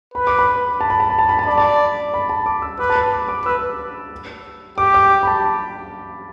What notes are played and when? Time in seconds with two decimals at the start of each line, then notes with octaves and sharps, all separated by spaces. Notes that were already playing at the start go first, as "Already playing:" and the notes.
0.14 B4 B5
0.27 D6
0.39 B5
0.81 A5
0.90 B5
1.00 A5
1.10 B5
1.19 A5
1.29 B5
1.39 A5
1.47 D5 B5
1.58 A5
2.14 B5
2.30 A5
2.46 D6
2.62 E6
2.79 B4 D6
2.90 A5
2.95 B5
3.13 D6
3.28 D6
3.45 B4 E6
4.78 G4 D6
4.94 D6
5.23 B5
5.27 A5